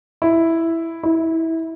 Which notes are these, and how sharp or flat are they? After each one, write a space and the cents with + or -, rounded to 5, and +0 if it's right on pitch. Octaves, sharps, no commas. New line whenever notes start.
E4 +0
E4 -20